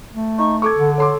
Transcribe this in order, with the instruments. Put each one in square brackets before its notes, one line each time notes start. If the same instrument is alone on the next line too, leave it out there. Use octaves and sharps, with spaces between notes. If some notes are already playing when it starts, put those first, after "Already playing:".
[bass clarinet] A3
[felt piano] D#4 [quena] C#6
[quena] A4 [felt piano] C#6 D6 G#6
[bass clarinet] D3
[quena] A4 [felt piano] C#5 C6 D6